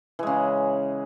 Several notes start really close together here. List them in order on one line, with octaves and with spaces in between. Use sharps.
E3 G#3 C#3